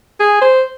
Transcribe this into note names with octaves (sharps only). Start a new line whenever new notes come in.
G#4
C5